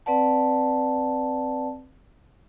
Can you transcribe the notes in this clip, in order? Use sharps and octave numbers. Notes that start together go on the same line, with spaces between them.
C4 B4 D5 F#5 A5